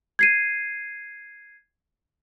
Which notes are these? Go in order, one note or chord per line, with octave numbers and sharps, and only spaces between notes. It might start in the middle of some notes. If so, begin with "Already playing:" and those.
G#6 C7 D#7